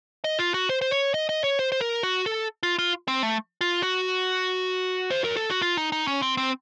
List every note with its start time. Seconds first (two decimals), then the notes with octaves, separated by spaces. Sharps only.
0.24 D#5
0.39 F4
0.54 F#4
0.69 C5
0.81 C5
0.91 C#5
1.14 D#5
1.29 D#5
1.44 C#5
1.59 C5
1.72 C5
1.81 A#4
2.03 F#4
2.26 A4
2.63 F4
2.79 F4
3.08 C4
3.23 A3
3.61 F4
3.83 F#4
5.10 C5
5.24 A#4
5.37 A4
5.50 F#4
5.62 F4
5.77 D#4
5.92 D#4
6.07 C#4
6.22 C4
6.37 C4